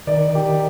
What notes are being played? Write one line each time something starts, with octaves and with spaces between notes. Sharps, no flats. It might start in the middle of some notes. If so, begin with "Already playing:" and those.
D#3 D5
G4